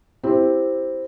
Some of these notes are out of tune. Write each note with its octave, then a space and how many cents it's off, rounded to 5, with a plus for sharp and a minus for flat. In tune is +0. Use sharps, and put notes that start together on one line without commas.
C4 +0 E4 +0 G4 +0